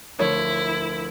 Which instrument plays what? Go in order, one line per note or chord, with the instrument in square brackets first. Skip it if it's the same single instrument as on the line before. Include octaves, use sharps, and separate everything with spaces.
[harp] D2 F3 [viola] E4 [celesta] A#4 [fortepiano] C#5